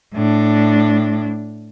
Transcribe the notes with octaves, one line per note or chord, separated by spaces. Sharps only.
A2 D4